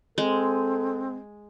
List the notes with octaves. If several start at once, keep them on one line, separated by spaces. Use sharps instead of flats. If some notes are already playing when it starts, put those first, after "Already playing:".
G#3 C4 A4